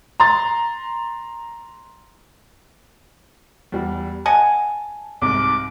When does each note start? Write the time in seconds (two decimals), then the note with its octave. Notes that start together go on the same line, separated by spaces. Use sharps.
0.20 A#5 C6 A6
3.72 E2 G3
4.26 D#5 F#5 G#5 A5
5.22 C2 G#2 D6